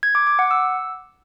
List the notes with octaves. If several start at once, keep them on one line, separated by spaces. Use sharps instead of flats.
G#6
D6
D6
F#5
E6